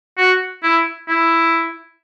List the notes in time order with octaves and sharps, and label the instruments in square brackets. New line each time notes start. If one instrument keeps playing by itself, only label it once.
[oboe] F#4
E4
E4